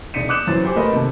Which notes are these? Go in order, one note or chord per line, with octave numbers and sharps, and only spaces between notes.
E1 D#4 D5 B6 C#7 D#7
D6 D#6 F#6 G6 C#7 E7
F#2 E3 F#3 C5 A6
G4 C5 G#5 D6
A3 B3 A#4 D#5 B5
C3 D#3 A4